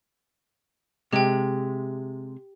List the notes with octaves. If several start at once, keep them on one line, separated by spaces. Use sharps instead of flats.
C3 G#3 G4 G5